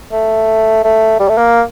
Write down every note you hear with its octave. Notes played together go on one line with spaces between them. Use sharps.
A3
A3
G3
A3
A#3